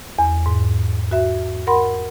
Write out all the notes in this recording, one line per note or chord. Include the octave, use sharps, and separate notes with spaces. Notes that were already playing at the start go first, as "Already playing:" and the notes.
E2
G#2
F#4 E5
A#4 F#5 B5 C6